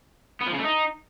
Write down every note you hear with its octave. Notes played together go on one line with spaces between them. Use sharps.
B3
F3
C#3
A3
D#4